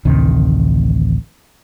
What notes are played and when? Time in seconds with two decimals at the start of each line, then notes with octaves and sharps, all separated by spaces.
0.05 A1 D2 C3 D#3